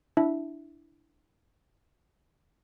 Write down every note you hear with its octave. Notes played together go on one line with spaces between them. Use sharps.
D4 E4 E5